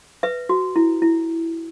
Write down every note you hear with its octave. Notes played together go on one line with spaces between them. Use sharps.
B4 E5
F#4
E4
E4